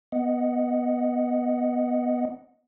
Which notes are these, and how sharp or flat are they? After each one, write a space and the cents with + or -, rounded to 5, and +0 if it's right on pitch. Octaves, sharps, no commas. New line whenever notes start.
B3 +0 D#5 +0 F#5 +0